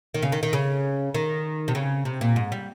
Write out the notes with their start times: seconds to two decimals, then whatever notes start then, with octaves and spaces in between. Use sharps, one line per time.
0.14 D#3
0.23 C#3
0.32 D#3
0.43 D#3
0.53 C#3
1.14 D#3
1.68 C3
1.75 C#3
2.05 C3
2.21 A#2
2.36 G#2
2.52 G3